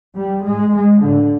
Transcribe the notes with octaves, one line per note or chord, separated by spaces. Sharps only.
G3
A2 G#3
G#3
A2 D3